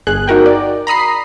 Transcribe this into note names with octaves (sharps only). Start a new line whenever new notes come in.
G1 G#4 F#6
D#4 F#4 A#4 G5
D5
A#5 B5 D#6 C7